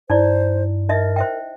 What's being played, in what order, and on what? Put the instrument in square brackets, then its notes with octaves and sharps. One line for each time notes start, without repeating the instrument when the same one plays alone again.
[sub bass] G2 [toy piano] D#4 E4 D5 [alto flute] C5
[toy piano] D#4 D#5 E5 [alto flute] A#4
[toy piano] C5 E5 G5